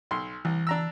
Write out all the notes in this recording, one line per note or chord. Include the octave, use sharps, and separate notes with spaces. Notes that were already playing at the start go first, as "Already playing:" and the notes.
B1 C6
C2 E3
D4 A#5 E6